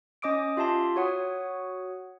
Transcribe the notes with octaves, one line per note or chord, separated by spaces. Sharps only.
C#4 D#5 D6 D#6 D7
F4 G4 E5 A5 C6
F#4 C#5 F#5 D#6